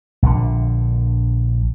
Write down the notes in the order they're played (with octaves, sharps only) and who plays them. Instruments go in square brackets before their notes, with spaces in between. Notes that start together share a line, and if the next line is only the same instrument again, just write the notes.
[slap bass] A#1 D3